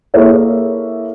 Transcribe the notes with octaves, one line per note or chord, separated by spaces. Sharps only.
A#3 E4 G#4 A4 C#5 E5